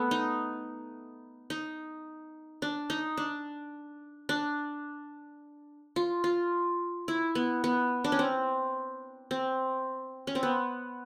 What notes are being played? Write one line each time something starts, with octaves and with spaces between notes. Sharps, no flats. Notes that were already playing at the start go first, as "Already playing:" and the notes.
Already playing: A3 B3
D#4
D#4
D4
D#4
D4
D4
F4
F4
E4
B3
B3
D4
C#4
C4
C4
C#4
C4
B3